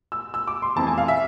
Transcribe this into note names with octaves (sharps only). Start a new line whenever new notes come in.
E6
E6
D6
C6
F1 F2 E3 A5
G#5
F5
E5